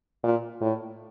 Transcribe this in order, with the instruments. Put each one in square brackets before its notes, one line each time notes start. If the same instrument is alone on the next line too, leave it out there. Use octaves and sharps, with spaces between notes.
[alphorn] A#2
A2